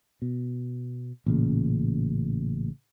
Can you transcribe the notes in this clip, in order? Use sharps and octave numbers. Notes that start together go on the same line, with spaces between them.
B2
A1 A#2 C#3